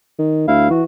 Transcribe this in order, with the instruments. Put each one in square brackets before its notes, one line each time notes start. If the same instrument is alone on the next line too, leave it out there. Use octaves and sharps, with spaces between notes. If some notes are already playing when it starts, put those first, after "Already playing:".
[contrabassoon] D#3
[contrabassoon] D2 [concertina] E4 F5
[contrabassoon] E3 [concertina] F#4